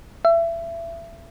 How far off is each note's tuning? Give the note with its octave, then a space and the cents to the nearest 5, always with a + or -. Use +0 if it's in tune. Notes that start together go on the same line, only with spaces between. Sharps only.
E5 +25